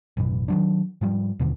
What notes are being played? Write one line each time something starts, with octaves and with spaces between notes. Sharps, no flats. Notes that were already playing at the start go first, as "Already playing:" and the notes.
A1 F#2 B2
D#3 F#3 D4
G#2 F3 G3
D#2 B2 D3